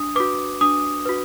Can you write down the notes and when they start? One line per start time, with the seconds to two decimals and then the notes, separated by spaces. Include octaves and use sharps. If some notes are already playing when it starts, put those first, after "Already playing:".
Already playing: D4 D#6
0.16 F#4 B4 D6
0.61 D4 D#6
1.06 F#4 B4